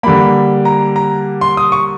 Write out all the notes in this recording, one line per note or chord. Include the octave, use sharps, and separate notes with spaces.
D3 G3 A#3 B5
A#5
A#5
C6
D#6
C#6